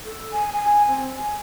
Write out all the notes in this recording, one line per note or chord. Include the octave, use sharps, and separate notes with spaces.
A4
G#5
G#5
C4
G#5